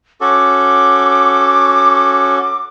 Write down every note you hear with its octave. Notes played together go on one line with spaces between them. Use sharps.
C#4 F#4 A4 D6